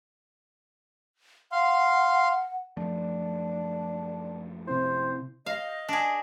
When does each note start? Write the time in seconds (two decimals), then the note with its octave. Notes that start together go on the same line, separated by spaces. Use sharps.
1.52 F5 F#5 C6
2.77 F#2 F3 A3 D4
4.67 C3 C4 E4 C5
5.46 D#5 F5
5.89 D4 G#4